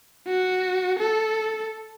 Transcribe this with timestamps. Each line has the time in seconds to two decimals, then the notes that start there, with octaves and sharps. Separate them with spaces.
0.27 F#4
0.99 A4